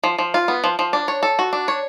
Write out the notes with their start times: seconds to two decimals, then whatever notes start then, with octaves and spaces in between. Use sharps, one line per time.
0.04 F3
0.19 F3
0.34 F4
0.48 B3
0.64 F3
0.79 F3
0.93 D4
1.08 C#5
1.23 A4
1.39 F#4
1.53 D4
1.68 C#5